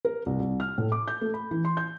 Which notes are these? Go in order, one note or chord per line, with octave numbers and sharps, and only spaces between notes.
A#4
C2
C2
F6
A2
D6
G6
A3
B5
E3
C6
G6